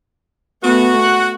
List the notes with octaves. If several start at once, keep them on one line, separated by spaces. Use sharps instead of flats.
A3 B3 F#4
F#5